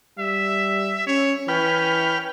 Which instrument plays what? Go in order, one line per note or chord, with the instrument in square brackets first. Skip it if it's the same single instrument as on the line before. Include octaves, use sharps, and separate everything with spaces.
[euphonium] G3 [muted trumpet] E5
[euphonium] C#4 [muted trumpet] C#5
[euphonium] E3 [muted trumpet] C#4 [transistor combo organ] B4 G5 F6